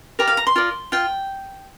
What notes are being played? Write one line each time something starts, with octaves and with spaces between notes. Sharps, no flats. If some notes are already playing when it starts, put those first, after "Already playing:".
G4 A#4 D5 A#5
F5
A#5
C6
F4 A#4 D5
F4 G5